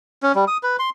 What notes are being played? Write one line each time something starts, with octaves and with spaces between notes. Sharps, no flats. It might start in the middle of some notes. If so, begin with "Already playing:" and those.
C#4
G3
D#6
B4
C6